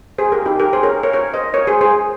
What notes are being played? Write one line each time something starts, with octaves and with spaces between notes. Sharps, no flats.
G#4 C5
G4 A#4
D#4 G4
G4 A#4
G#4 C5
A#4 C#5
A#4 C#5
A#4 C#5
C5 D#5
A#4 C#5
G#4 C5
G#4 C5